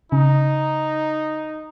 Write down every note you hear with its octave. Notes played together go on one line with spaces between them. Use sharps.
C#3 D#4